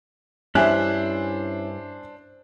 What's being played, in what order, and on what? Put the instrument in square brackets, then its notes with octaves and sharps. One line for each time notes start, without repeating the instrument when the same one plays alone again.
[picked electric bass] G2 [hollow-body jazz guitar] C#4 E4 [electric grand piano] D4 C5 [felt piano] E5 G#5 F#6